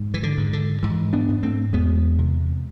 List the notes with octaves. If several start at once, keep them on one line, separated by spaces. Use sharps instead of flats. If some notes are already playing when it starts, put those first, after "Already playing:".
Already playing: G#2
E3
D3
G#2
D3
G#2 E3
B3 D4
G#2
A3 C4
E2 G#3 B3
C3